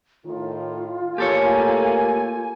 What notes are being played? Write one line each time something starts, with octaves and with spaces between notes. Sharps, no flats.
A2 D#3 F4
A2 A3 A#3 G4 A4 C#5 G#5